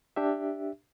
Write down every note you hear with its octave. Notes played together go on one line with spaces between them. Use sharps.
D4 G4 E5